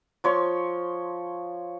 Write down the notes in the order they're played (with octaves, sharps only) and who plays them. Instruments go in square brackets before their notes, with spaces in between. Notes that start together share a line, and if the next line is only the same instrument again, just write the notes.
[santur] F3 C#5 C6 C#6